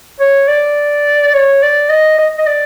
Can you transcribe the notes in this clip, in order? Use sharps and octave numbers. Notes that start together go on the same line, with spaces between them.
C#5
D5
C#5
D5
D#5
D#5
D#5
D5